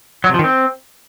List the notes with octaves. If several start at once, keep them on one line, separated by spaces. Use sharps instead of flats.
F#3
C3
F3
D#3
C4